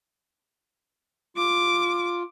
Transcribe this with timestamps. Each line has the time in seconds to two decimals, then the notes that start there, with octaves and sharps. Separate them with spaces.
1.37 F4 D6